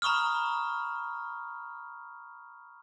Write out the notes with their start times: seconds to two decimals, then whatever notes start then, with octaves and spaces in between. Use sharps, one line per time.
0.02 A#5 B5 C#6 D#6 F6